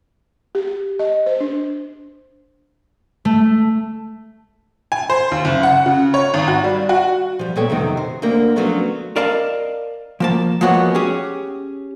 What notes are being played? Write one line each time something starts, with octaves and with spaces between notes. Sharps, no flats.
G4
D#5
C5
D4
A3
G#5
C5
D#2
F#1
F#5
C#3
C#5
G#1
F#4
G3
F#4
F3 G3
A#2 G#3 B3 A4 C#5 G5
F2 C3 D#3 F#3
C5
D2 D3 A#3 C4 A#4
F3 F#3 A3 B3 C#4 D4
A#4 D5 D#5 F5 A5 A#5
F3 A#3 A5
F3 G#3 A#3 B3 F#4 C#5
C#4 G4 G#4